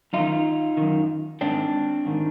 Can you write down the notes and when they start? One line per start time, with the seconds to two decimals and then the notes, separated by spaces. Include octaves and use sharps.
0.13 F#2 D#3 D#4 F4
0.77 F#2 D#3
1.41 G#2 D#3 C4 D4
2.05 G#2 D#3